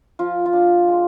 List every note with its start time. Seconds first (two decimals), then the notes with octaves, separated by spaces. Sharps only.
0.19 F3 F4
0.46 F4
0.53 D4
0.88 G#3